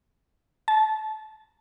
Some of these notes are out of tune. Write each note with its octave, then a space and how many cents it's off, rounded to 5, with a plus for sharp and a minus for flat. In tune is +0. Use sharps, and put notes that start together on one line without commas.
A5 -25